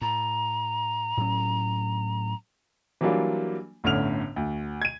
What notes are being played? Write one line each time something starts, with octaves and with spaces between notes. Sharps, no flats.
A2 A#5
A2 F#3 C#4
E3 F#3 G3 A#3 D4 F4
G1 A2 D3 C#4 F6 F7
D2
G#6 D#7